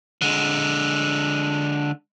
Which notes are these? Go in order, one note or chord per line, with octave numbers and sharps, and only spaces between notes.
D3 G#3